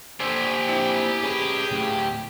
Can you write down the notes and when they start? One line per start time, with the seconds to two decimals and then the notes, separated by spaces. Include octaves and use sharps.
0.20 D3 A#3 G4 C5 G#5
0.68 C4 D4 E4
1.23 C#4 G#4 B4
1.71 D2 A2